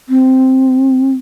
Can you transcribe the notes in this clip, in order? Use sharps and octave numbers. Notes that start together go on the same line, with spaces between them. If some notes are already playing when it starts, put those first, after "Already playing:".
C4